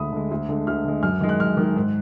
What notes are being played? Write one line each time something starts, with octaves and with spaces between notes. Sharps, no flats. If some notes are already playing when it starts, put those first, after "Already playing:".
Already playing: D2 D3 G#3 B5 D#6
D3 G#3
D2
D3 G#3
D2 F6
D3 G#3
F#2 F6
D#3 G#3
F#6
F#2 F6
D#3
G#3
G#2